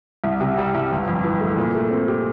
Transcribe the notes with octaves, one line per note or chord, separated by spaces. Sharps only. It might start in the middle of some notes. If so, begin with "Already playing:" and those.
C2
C3
G3
C2
G1
F2
E3
A3
A#2
A3
C4
G4